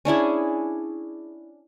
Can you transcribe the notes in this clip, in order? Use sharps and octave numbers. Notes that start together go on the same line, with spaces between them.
C#4 D4 E4 G#4